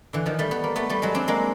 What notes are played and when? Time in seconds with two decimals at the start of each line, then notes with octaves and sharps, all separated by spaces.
0.13 D3 E3
0.26 D#3 F3
0.39 G3 A3
0.51 B3
0.64 A#3
0.76 A3 B3
0.89 G3 A3
1.02 F#3 G#3
1.15 C4 D4
1.28 G#3 A#3